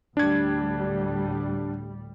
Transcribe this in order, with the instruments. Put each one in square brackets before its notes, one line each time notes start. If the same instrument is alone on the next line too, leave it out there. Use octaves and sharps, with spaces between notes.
[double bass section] D2 A2 G3 [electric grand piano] D4 G#6